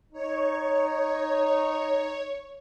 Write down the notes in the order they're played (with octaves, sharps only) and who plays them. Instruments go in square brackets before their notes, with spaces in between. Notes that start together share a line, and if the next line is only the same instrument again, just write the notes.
[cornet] D#4 [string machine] C#5